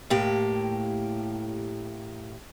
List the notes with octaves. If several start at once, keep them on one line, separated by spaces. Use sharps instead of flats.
A2 A#3 G4